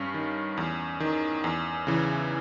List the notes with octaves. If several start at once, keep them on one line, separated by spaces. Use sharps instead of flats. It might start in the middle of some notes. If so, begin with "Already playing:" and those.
Already playing: G2 C#4
D#3
E2
D#3
E2
C#3 E3